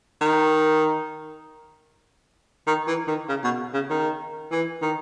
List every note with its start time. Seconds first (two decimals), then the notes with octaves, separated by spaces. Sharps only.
0.21 D#3
2.67 D#3
2.87 E3
3.08 D#3
3.29 C#3
3.44 B2
3.74 C#3
3.90 D#3
4.52 E3
4.82 D#3